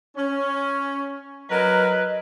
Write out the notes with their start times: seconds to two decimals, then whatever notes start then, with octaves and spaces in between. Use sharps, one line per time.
0.16 C#4
1.50 F#3 A#4 B4 D#5